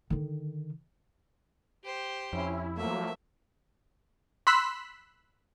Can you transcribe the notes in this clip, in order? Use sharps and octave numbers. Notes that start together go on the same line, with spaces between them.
D3 D#3
G4 C5
F2 C#4 E4
F3 F#3 A3 A#3 E5
B5 C6 E6 F#6 B6